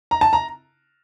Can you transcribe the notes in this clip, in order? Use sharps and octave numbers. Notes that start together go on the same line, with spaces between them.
A#5
A5
A#5